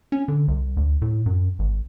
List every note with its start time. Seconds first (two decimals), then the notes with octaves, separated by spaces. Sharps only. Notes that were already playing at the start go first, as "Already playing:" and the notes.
0.12 C#4
0.28 D3
0.48 C2
0.77 D2
1.02 A2
1.26 F#2
1.59 G#1